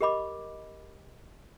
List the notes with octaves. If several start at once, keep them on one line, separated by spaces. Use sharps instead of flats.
G4 A#4 D#5 B5 D6